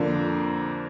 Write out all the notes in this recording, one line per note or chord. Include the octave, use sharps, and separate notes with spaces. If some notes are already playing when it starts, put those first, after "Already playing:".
Already playing: F2 D3 F3 A#3 D5